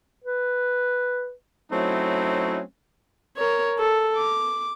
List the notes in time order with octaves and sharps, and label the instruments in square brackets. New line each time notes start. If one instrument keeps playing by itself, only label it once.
[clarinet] B4
[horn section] F#3 A3 C4 C#4 D#4 E4
[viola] A#4 C#5
A4
D6